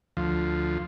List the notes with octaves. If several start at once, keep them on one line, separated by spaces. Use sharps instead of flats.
D2 F3